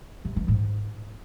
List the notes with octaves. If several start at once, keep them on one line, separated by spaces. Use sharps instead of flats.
C3
E3
G#2